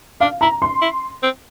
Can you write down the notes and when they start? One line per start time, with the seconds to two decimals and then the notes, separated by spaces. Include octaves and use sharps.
0.20 D4 F5
0.41 E4 A#5
0.62 C6
0.82 E4
1.23 C4